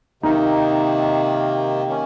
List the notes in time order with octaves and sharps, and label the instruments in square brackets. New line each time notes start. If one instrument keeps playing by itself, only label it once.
[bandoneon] C3 D#3 A#3 [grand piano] D#4
[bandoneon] D#3 A#3 C#4